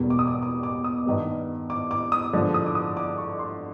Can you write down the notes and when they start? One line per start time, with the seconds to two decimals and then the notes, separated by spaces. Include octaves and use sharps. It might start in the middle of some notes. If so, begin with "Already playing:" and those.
Already playing: E1 E2 B2 G3
0.10 D6
0.19 D#6
0.27 D6
0.42 D6
0.63 D6
0.84 D#6
1.06 G2 D#3 G3 B3
1.70 D6
1.91 D6
2.12 D#6
2.33 G2 D3 F3 G#3
2.54 D#6
2.66 D6
2.75 D#6
2.97 D6
3.18 C#6
3.39 C6